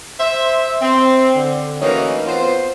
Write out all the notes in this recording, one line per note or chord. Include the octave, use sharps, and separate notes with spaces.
C5 E5
C4
D3
E3 F#3 A3 A#3 C#4 D#4
B3 C4 F4 C5